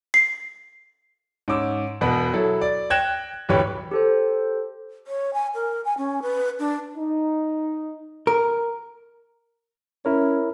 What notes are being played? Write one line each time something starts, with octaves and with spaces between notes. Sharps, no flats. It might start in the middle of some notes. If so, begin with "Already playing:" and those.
C7
G#2 C#4 D6 E6
E1 B2 B4
F#3 E4 A4
D5
G5 F#6 G#6 A#6 E7
D1 E3 G4 B4 C#5
G4 A4 C5
C#5
G#5
A#4
G#5
C#4
B4
D4
D#4
A#4
C#4 E4 A#4 C#5